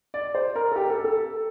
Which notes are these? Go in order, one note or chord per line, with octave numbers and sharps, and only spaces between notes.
D5
C5
A#4
A4
G4
A4
A4